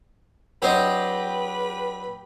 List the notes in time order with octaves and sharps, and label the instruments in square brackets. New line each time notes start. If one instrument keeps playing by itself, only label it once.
[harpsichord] F#3 C4 D4 [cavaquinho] G4 C5 D#5 [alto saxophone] B4